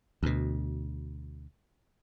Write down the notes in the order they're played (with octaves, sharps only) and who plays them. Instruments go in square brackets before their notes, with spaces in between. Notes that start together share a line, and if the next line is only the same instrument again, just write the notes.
[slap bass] D2 B2